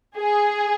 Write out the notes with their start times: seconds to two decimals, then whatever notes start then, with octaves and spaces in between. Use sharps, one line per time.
0.17 G#4